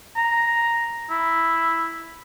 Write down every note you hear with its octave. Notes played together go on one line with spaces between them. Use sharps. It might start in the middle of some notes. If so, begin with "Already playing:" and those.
A#5
E4